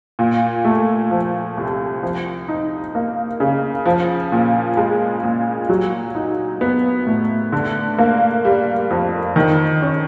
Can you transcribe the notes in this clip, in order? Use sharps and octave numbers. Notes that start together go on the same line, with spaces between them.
A#2
A3
F3
C2
F3
D#4
A#3
C#3
F3
A#2
G#3
A#2
F#3
D#4
B3
A2
D3
A#3
G3
F2
D#3
C#4